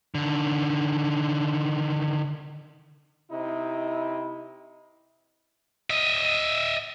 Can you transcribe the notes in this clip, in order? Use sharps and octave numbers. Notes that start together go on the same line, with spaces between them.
D3 D#3
C3 D#4 E4
D#5 E5